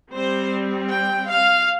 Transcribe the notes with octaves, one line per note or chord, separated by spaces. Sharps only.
G3 C4 C5
G5
F5